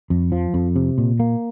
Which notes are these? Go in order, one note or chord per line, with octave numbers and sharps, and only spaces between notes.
F2
F3
F2
C3
A#2
A#3